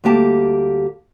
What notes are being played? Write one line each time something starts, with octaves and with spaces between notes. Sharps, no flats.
D2 G3 A#3 G4 A5